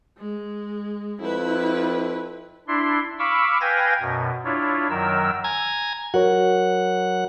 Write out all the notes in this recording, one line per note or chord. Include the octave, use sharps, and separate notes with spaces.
G#3
F2 E4 B4
D4 E4 C6
F5 B5 C#6 D6 E6
B4 F5 G5 G#5 G#6 A#6
F#2 B2
D4 E4 F4 C#5
F#2 D#3 F#3 A#4 E6
G#5 A#5 G#6
F#3 F#4 A#4 C#5 F#5